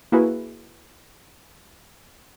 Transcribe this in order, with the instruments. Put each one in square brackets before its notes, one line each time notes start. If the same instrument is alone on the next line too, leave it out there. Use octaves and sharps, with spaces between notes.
[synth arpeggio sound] A#3 E4 F#4 G#4 B4